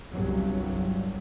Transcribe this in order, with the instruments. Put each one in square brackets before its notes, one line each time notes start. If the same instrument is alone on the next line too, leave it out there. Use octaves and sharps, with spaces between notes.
[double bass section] G1 C2 G2 F#3